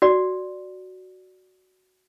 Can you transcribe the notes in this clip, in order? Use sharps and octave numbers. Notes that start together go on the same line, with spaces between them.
F#4 D5